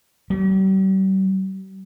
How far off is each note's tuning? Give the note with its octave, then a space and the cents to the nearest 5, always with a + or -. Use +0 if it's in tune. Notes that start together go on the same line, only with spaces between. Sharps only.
G3 -40